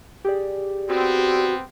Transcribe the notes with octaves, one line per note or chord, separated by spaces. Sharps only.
G4 G#4 D5
B3 C4 F#4